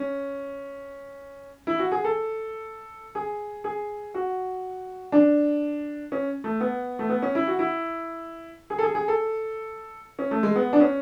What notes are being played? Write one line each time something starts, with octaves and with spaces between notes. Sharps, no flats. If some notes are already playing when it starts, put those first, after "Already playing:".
Already playing: C#4
E4
F#4
G#4
A4
G#4
G#4
F#4
D4
C#4
A3
B3
A3
B3
C#4
E4
F#4
E4
G#4
A4
G#4
G#4
A4
C#4
A3
G#3
B3
D4
C#4